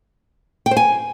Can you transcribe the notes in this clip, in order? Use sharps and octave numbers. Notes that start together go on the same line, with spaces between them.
G5
C5
G#5